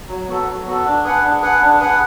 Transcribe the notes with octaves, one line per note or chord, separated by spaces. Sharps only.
F#3
B3 F#4 A4
F#3
B3 F#4 A4
D4
G#4 B4 F#5
D4
G#4 B4 F#5
D4
G#4 B4 F#5